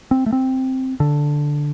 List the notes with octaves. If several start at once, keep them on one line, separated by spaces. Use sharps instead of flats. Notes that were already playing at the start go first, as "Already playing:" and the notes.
C4
A3
C4
D3